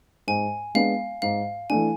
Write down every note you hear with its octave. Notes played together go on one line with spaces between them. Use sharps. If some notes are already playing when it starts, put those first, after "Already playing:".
G#2 G#5
G#3 B3 D4 F5
G#2 F5
E3 A3 D4 G#5